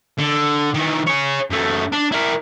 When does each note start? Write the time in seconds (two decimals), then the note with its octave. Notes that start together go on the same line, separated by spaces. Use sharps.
0.19 D3
0.75 D#3 E3
1.07 G#4 C#5
1.51 F#2 A3
1.92 D4
2.12 E4 A#4